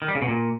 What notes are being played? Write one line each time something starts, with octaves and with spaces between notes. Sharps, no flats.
D#3
G3
C#3
B2
A#2